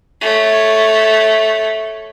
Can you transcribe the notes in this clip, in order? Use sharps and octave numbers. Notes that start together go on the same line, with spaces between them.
A3 C#5